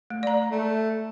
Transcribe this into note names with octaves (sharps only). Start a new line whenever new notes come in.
A3
D5 A#5
A3